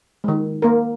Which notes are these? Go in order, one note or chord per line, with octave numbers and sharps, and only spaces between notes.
D#3 G#3
A#3 A#4